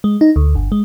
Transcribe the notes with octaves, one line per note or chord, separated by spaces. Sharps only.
G#3
D#4
D2
G1
G#3